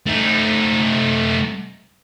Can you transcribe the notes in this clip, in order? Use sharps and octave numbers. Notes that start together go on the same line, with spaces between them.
A3 D#4